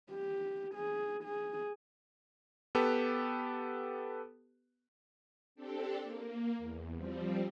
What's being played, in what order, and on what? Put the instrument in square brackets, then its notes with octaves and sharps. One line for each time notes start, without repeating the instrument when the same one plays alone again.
[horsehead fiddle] G4
G#4
G#4
[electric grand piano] B3 G4 A4 B4
[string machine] C4 D4 G4 A4
A#3
E2
F3 G3 C4